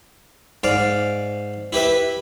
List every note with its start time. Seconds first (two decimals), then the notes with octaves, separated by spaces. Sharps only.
0.64 G#2 D5 F5
1.73 E4 G4 B4 E5